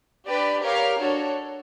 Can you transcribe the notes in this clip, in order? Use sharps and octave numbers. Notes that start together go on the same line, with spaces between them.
D4 G4 B4 D5
G4 A#4 C#5 F5
D4 F#4 A4 C#5